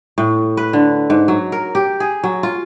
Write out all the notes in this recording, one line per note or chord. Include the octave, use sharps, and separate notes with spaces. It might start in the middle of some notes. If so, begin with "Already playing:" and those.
A2
B4
D3
G#2
F#3
A#4
G4
G#4
F#3
F4